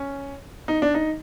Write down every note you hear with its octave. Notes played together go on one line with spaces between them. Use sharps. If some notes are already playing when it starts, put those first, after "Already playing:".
Already playing: C#4
D#4
D4
D#4